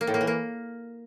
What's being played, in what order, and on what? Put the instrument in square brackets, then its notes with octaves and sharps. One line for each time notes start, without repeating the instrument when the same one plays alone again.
[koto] A#3
A2
A#3
E3
A#3